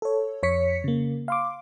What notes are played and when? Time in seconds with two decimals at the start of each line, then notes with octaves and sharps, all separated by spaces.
0.02 A4 C#5
0.43 F2 C#5 B6 C#7
0.84 C#3 A#3
1.28 F5 C6 D6